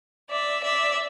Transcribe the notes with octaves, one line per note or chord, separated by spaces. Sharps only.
D5 E5
D5 E5